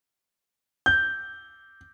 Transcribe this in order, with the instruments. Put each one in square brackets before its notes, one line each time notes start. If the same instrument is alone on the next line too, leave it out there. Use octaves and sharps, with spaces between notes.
[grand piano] G6